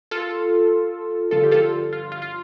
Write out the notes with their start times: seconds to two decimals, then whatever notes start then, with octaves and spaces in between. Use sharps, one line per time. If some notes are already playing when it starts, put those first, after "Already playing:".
0.11 F4 A4
1.31 G2 D3 F3 F4 A4
1.43 G4
1.51 F4 A4
1.92 F4
2.12 F4
2.22 F4